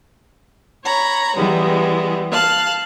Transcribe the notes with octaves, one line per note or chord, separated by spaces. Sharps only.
C#5 A#5 B5
E3 G3 G#3 B3
F5 A5 F#6